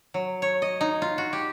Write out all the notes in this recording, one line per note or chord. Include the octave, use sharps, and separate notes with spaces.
F#3
C#5
D#5
D#4
F4
F#4
G4